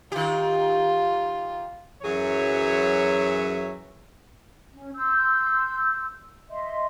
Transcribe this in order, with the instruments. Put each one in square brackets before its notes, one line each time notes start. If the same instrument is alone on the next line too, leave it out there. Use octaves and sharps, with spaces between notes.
[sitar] D#3 G4 [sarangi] F4
[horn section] F#2 E3 F#3 G#4 C#5 E5
[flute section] C#4
C6 E6 G6
D#5 E5 C6